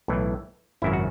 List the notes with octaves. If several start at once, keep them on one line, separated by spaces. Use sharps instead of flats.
B1 A2 E3
G#1 F#2 C#3 E4
F#4